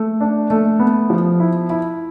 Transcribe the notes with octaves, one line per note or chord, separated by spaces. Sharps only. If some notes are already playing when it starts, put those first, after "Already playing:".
Already playing: A3
D4
A3
B3
F3
E4
E4